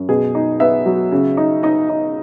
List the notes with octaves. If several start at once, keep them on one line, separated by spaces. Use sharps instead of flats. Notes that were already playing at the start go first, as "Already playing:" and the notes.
Already playing: F#2
B2 G#4
D#4
B3 E5
F#3
C#3
D#4
D#4 D#5
D#4